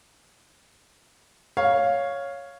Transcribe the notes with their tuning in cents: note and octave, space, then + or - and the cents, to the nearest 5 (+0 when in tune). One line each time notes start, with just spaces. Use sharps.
C#5 +0 F5 +0